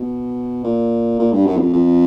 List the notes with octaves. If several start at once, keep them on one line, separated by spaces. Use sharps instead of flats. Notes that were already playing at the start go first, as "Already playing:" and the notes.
Already playing: B2
A#2
A#2
G2
F#2
E2
F2
F2